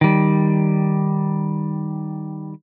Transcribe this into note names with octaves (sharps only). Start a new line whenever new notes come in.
D#3 G3